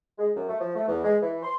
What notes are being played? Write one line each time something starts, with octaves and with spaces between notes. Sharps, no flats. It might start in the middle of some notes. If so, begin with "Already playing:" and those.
G#3
F#2
A3
F3
A3
E2
G#3
E3
C6